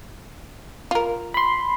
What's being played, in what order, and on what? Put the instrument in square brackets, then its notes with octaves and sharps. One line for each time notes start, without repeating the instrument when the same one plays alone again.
[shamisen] F4 A#4
[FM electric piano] B5 C6